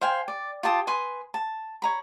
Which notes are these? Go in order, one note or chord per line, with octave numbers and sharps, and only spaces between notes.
C5 F5 G5 G#5
D5
F4 G4 A5 D#6
B4 G#5 C6 D#6
A5
C#5 A#5 B5